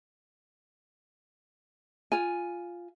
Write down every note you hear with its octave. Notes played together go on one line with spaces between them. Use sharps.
F4 G#5